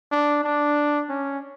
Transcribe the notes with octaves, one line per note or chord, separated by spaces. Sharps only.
D4
D4
C#4